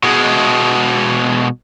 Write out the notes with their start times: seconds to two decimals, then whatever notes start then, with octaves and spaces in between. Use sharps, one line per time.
0.03 B2 G#3